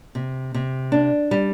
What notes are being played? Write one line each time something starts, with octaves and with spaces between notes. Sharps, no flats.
C3
C3
D4
G3